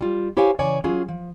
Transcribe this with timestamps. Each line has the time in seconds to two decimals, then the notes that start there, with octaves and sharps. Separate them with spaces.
0.01 G3 F4
0.37 E4 G4 C5 C#5 F5 G#5
0.59 C#3 E3 C#5 D5 G#5
0.84 F#3 C#4 F4 G#4
1.08 F3